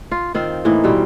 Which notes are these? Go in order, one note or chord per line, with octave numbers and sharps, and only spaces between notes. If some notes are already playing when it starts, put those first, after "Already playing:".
F4
D#3 C4 F4 F5
A2 E3 A#3 D#4
B2 G3 C4